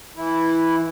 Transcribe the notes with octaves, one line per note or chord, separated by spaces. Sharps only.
E3 E4